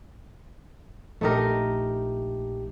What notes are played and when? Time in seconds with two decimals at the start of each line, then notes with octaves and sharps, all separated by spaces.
1.21 A#1 A3 D#4 G4 A#4